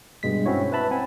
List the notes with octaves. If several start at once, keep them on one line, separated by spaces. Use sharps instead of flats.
G2 B2 G#3 B6
C4 C#4 E4 F#4 C#5
B4 E5 A5 B5
C4 F#5 G#5 B5